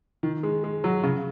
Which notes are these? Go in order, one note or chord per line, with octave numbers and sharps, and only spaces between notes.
D#3
G#3
G#3
F#3
C#3